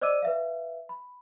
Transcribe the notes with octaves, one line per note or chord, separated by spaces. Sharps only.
C5 D5 D#5 D6 E6 D#7
B4 E5 F5
B5